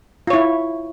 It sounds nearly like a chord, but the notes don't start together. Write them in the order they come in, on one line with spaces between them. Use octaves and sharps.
F4 C#5 E4